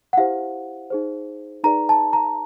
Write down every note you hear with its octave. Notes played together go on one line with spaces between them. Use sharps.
F#5
E4 G4 C5 F5
D#4 G#4 C5
D#4 G#4 B4 D5 A#5
A5
A#5